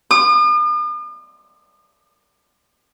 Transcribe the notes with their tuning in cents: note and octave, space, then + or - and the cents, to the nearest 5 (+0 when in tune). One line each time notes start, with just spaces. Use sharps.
D#6 -45